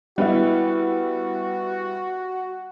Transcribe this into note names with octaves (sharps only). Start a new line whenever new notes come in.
G3 B3 E4 F#4